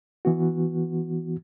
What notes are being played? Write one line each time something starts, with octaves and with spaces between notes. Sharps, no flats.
E3 B3 F#4